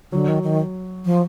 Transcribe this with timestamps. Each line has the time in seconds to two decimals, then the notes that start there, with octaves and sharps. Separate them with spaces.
0.12 D3 F#3
0.28 D#3
0.43 D#3
1.05 F3